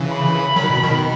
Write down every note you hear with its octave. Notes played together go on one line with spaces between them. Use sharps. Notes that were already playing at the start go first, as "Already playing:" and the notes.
Already playing: C#3 E3
B5
D#3 F#3
B2
B2 D#3